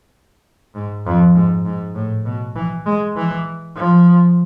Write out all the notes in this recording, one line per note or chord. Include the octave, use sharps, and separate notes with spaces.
G#2
F2
G#2
G#2
A2
B2
E3
G#3
E3
F3